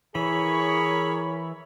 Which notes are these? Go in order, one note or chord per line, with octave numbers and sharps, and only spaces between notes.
E3 G#4 A#4 C#5 B5